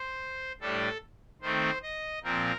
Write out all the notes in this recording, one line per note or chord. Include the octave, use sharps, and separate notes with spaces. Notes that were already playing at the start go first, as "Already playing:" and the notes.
Already playing: C5
A2 G3 D4 A4
D#3 A3 C4 C5
D#5
A#2 F3 C4 A#4